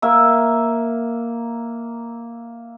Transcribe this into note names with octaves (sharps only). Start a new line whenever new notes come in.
A#3 E5